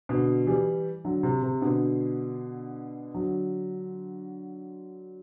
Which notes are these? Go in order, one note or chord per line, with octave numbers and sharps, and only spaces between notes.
B2 D3
E3 G3
D3 F#3
C3
C3
B2 D3
D3 F#3